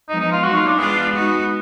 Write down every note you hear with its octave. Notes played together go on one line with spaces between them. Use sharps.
F3 G#3 B3 D#4
D#4
F4
F#3 A#3 D#4 F#4
F4
D4
G#3 B3 D4 F4 G#4
G#3 D#4 F#4